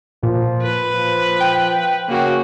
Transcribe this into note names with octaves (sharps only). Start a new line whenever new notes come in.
A#2 F3
B4
F3
G5
C#3 A#3 F#4